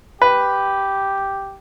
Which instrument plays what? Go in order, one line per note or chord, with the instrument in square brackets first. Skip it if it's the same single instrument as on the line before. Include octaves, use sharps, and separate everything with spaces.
[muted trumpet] G4 [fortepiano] B4